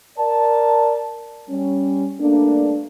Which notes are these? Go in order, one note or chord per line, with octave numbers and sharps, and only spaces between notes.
A#4 D5 A5
G3 C#4
G2 A3 A#3 D4